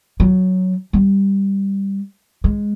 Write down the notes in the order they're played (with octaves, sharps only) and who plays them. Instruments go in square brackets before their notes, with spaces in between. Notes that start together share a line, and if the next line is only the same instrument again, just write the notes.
[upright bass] F#3
G3
G#3